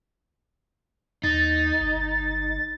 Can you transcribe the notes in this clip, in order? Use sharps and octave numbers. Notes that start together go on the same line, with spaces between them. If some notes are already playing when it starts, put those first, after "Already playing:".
D#2 D#4 A6
G1